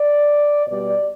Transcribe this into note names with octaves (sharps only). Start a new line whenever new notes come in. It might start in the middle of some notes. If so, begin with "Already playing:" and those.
Already playing: D5
B2 G3 D5